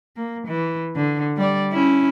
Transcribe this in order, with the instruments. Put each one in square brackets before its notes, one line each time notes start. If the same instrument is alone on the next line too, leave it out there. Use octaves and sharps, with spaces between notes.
[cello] A#3
E3
D3
G3 D5
C#4 E4